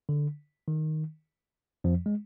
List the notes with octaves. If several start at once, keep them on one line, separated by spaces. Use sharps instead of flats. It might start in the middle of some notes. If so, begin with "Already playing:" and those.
D3
D#3
F2 F3
G#3